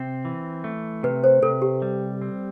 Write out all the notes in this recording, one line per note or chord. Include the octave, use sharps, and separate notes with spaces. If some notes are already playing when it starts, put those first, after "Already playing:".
Already playing: C3 C4
E3
A3
C3 B4
C5
C3 A4
G4
G3
C4